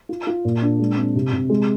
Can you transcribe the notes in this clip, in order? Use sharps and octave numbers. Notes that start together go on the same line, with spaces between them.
F4
F4
A#2
D4
G#3
C4
C3
C3
G#3